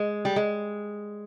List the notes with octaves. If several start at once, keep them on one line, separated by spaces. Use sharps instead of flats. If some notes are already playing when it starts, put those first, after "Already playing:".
Already playing: G#3
G3
G#3